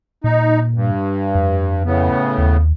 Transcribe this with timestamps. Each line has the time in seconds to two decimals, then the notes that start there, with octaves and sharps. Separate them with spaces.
0.24 A#2 D#4
0.74 G2
1.35 F2
1.85 A2 C#3 B3
2.38 D#2